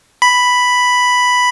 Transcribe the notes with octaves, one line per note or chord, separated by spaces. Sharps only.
B5